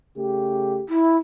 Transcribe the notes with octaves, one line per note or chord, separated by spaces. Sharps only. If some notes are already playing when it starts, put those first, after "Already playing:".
C#3 A3 G4
E4